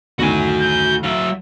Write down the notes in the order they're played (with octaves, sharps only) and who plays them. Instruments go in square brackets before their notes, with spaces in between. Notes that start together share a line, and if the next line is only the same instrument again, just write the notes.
[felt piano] D2 A2 D#3 [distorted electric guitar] F#4 G#5
[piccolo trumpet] G6
[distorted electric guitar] F#3 F5 [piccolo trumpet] E5